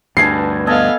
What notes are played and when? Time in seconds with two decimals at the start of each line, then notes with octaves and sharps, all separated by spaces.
0.17 D2 G2 B4 G#5 A5 C7
0.67 B3 A4 D#5 F5 G#5